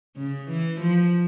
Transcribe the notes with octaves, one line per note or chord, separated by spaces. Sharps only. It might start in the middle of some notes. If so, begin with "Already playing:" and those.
C#3
E3
F3